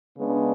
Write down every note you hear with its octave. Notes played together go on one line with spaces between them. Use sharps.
C#3 G#3 B3 D4